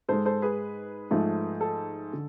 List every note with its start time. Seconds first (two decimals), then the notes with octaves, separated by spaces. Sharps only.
0.08 G#2 G#3 A4 C5
0.25 A4 C5
0.42 G#4 B4
1.11 G#2 F3 A3
1.61 A4
2.13 D3